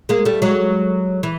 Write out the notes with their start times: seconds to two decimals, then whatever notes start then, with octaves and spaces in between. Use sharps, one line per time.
0.09 G#3 A#3
0.25 G3 A3
0.42 F#3 G#3
1.23 E3